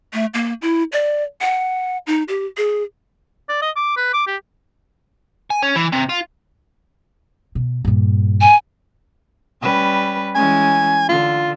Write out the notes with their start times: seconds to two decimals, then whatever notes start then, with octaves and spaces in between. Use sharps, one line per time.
0.13 A3
0.34 A#3
0.62 E4
0.92 D5
1.41 F#5
2.07 D#4
2.28 G4
2.57 G#4
3.49 D5
3.62 D#5
3.76 D6
3.97 B4
4.13 D6
4.27 G4
5.50 G#5
5.63 C#4
5.76 E3
5.92 C3
6.09 F4
7.55 B2
7.85 G2 A#2
8.41 G#5
9.61 G3 C#4 B4
10.35 E3 G#3 C#4 G#5
11.09 D3 F4